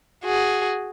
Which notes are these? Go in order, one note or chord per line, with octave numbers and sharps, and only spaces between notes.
F#4 G#4